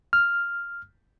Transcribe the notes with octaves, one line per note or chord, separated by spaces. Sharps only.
F6